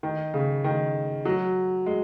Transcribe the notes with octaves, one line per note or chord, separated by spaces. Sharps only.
D#3
C#3
D#3
F#3
G#3